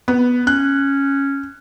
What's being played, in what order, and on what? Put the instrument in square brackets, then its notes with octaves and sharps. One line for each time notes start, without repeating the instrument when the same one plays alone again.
[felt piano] B3
[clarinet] C#4 [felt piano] F#6